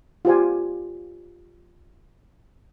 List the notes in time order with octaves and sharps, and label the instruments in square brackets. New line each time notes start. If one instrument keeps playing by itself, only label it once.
[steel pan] F4 G4 C5 G#5